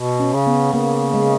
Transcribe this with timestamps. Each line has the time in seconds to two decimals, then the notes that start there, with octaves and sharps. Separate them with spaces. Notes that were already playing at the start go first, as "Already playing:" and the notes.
Already playing: B2
0.20 C#4
0.33 C#3
0.47 B3
0.73 C#3 A#3
1.14 G#3